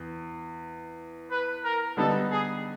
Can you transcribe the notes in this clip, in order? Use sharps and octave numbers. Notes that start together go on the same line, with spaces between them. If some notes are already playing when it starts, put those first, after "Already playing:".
Already playing: E2
B4
A#4
D3 G3 B3 D#4 A4
G#4